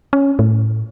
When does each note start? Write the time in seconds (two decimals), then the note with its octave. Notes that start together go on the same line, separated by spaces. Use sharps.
0.13 C#4
0.39 A2